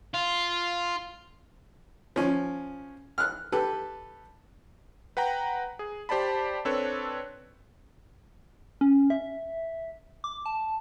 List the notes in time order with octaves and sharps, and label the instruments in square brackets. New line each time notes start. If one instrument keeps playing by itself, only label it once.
[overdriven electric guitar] F4
[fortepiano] F3 C#4
F6 F#6
G4 A4 B4
[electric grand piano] B4 F#5 G5 A#5
G#4
G4 C5 D5 A5 B5
C4 D4 A4 B4 C#5
[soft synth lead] C#4
E5
D6
A5